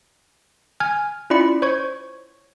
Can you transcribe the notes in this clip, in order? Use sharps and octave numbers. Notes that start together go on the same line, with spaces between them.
G#5 F6 G#6
C#4 E4 F4 D5 B5 C#7
C5 C#5 C#6 G#6